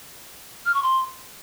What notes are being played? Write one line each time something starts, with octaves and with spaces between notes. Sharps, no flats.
F6
C#6
C6